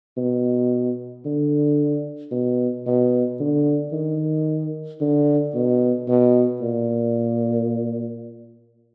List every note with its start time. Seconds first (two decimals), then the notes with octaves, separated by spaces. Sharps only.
0.17 B2
1.25 D3
2.31 B2
2.86 B2
3.40 D3
3.93 D#3
5.01 D3
5.54 B2
6.08 B2
6.61 A#2